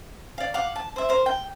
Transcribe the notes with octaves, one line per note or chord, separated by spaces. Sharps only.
D5 F5
F5 F#5 D6
A5
C5 E5
A#4 C5
G5